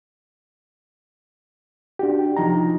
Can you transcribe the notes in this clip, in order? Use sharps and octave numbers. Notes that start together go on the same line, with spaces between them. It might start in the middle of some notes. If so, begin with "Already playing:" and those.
D4 F#4 G4
C2 F3 D#4 A#5